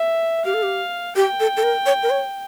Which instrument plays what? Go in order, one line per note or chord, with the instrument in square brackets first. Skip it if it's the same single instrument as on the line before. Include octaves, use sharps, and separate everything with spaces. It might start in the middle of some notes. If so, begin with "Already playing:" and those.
Already playing: [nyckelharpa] E5
[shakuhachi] G4 [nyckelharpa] F5
[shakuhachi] A4
G4
[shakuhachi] G4 [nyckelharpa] G5
[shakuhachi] A4
A4
A#4
C#5
A#4
C#5